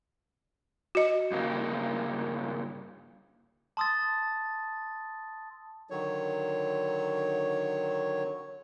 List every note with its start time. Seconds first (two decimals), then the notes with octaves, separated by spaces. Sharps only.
0.95 F#4 D#5
1.31 G2 C#3 A#3
3.77 A5 C6 D#6 E6 A6
5.90 D3 D#3 F#3 C#5